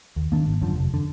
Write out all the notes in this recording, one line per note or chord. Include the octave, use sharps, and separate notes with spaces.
D#2
D#3 A#3 D4
G#1
F#2 D3 F3
F1
D3